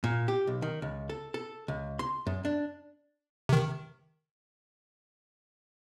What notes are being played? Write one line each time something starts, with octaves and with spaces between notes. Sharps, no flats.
A#2
G4
B1
D#3
C#2
A4
A4
C#2
C6
F#2
D4
C3 D#3